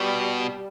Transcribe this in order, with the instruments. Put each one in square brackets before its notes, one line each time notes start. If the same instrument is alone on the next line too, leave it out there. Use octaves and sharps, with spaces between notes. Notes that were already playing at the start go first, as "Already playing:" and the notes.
Already playing: [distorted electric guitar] B2 [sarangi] G3